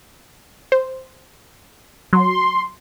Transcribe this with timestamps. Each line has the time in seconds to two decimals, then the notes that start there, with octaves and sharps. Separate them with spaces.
0.72 C5
2.13 F#3 C6